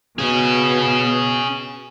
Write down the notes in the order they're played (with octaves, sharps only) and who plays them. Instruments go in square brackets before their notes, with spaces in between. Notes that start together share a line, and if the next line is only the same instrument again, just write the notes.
[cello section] B2 [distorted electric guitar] C#4 G#4